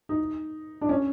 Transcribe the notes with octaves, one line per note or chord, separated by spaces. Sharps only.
D#4
D4
C#4